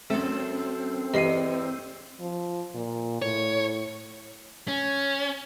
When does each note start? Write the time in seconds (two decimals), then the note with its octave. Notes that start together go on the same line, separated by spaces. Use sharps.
0.10 F#2 A3 C4 A4
1.14 E2 G2 C3 D#5 C7 D#7
2.20 F3
2.74 A#2
3.22 A2 C#5
4.68 C#4